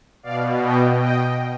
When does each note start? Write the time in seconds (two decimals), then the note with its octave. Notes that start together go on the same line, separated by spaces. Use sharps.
0.23 B2 D5 F5
0.61 D#5 G5
1.00 D#5 G5